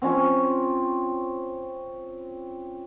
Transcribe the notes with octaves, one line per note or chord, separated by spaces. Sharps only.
C4 C#4 F4 C#5